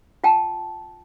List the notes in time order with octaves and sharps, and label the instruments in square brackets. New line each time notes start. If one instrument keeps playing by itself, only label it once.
[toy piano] F4 G5 A5